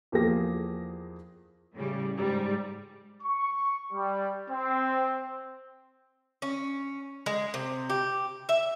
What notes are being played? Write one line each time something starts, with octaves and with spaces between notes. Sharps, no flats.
E2 F3 A#3 G4 G#4 A#6
A2 C#3 G3
G#2 G3
C#6
G3
C4
C#4
G#3
C3
G4
E5